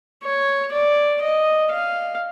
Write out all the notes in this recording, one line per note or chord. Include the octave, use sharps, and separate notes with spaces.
C#5
D5
D#5
F5